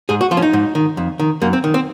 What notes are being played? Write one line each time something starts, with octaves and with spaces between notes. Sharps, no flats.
G#2 G#4
F#4
F3 F4
C#4
D#4
G#2
D#3
F2
D#3
F#2 A#3
C4
D#3
C4